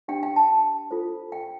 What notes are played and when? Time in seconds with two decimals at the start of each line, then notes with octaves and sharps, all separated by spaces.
0.08 D4 G4 C5 G5
0.23 G5
0.36 A5
0.91 F4 A4 C5
1.32 G5